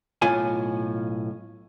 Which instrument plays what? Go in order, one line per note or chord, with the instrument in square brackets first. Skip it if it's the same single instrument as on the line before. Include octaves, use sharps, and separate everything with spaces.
[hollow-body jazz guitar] B1 A2 F4 G#5